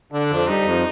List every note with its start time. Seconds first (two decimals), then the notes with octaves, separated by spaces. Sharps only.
0.12 D3 D4
0.30 F2
0.48 G3 D#4
0.65 F2